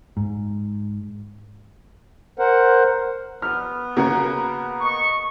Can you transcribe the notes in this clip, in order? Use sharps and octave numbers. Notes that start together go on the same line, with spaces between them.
G#2
A#4 C5 F#5
B3 F6
C#3 A#3 F#4 A#4
D#5 C#6